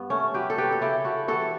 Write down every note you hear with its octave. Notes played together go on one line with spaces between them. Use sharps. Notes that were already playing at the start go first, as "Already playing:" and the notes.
Already playing: G2 B3
A3 C#4
F#3 G4 B4
A4
G4 B4
A4
C#3 E4 G4
F#4 A4
E3 G3 F#4 A4